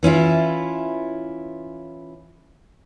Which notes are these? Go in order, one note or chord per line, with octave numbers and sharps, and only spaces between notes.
E3 C#4 E4 F4